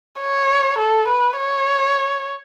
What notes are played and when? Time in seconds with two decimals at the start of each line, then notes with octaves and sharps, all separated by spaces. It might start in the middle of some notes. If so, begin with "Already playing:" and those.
0.21 C#5
0.79 A4
1.08 B4
1.37 C#5